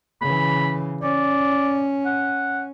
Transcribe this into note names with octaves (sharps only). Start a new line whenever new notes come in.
C#3 E3 B5
C#4 D5
F#5